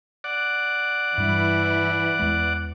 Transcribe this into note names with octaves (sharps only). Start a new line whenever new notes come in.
D5 F#5
G2 E3 G3 E4
E2 G#3